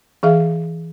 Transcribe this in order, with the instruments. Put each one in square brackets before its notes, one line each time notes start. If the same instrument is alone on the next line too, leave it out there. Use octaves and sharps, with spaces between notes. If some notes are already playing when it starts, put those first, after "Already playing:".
[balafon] E3 G#4 E5 F5